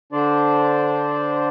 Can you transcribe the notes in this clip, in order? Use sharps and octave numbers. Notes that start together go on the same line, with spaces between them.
D3 D4 C5 D5